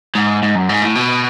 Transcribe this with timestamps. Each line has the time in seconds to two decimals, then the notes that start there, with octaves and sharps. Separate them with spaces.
0.15 G#2
0.43 G#2
0.55 F#2
0.69 G#2
0.82 A2
0.95 B2